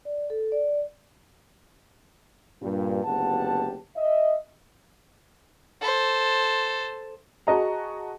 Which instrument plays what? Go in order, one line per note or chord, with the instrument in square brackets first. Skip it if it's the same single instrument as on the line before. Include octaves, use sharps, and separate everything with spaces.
[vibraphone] D5
A4
D5
[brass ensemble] G2 A#2
F#1 D2 B3 G4 F#5 A5
D#5 E5
[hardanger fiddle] A4 C5
[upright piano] F#4 G#4 D#5 A5 A#5